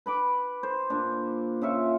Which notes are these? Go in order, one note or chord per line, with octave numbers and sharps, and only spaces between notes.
B4 B5 D6
C5
A#2 D4
C#3 F4 E5 C#6